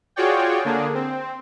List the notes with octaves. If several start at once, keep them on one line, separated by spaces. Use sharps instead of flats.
F4 F#4 G#4 C#5 D5 G5
D3 A#3 D4 G#4
C4